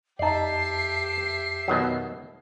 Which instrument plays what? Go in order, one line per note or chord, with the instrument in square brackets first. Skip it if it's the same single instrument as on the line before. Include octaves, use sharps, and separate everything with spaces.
[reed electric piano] F2 A5 [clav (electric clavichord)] D#4 D5 [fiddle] G4 E5 [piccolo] C7
[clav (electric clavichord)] B2 D#3 F#3